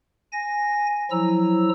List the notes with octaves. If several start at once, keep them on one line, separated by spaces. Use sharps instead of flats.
G#5 A#6
F3 F#3 E4 A#5 E6